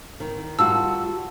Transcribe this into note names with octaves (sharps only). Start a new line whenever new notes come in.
D#3
G3 F4 F#4 A5 E6